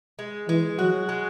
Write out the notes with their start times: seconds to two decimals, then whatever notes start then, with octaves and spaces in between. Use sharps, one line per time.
0.19 G#3
0.48 E3 G#3
0.79 F#3 F#4
1.09 G#3